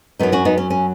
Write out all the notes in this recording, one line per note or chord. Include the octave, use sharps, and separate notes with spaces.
F#2 F#3 B3 D#4
C#4 F#4
B3 D#4
C#4
C#4